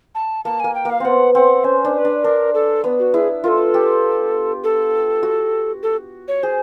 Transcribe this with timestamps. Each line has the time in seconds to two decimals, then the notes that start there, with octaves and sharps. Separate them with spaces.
0.15 A5
0.45 A#3 A5
0.60 A#3 G#5
0.75 G5
0.85 A#3 F5
1.00 B3 C4 F#5
1.34 C4 F#5
1.64 C#4 C5
1.85 D4
1.94 C5
1.98 B4
2.05 D4
2.24 D4 A#4
2.54 A4
2.84 B3
2.99 F#4
3.14 E4 G#4
3.44 F4 A#4
3.48 A4
3.74 G4
4.64 A4
5.23 F#4
5.83 A4
6.28 C#5
6.43 G#4 C5